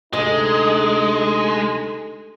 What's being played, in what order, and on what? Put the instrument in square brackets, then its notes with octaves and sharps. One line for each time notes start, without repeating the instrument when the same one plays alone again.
[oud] D2 C3 D#5 [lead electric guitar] G#3 [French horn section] D#4 A4